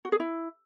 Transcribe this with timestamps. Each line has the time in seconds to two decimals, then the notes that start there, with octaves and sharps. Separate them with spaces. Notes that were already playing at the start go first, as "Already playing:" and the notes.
0.05 F#4
0.12 G#4
0.20 E4